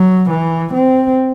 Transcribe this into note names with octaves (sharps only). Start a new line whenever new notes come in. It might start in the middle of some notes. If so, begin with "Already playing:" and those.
Already playing: F#3
E3
C4